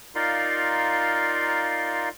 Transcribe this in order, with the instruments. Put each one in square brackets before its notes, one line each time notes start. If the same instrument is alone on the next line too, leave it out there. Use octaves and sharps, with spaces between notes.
[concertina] D#4 F4 A#4 D5 F5 C6